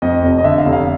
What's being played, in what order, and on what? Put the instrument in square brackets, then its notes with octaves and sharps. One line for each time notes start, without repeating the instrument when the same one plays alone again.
[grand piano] F2 D#5
F1
D#5
D3 E5
F5
F1
F5